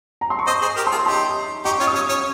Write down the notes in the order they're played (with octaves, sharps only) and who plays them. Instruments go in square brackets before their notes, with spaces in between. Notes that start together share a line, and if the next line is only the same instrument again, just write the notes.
[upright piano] A#5
C6
C#6
[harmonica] C5 D#5 [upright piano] D#6
[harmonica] G#4 C5
G4 A#4
[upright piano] C6
[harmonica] F4 G#4
[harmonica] D#4 G4 [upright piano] C6
[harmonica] D#4 G4 [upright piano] C#6
[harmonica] C#4 F4
[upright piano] D#6
[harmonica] C#4 [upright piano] C#6
[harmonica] C#4